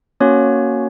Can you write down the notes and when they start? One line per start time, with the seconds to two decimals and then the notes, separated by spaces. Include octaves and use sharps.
0.20 A#3 C#4 F#4 C#5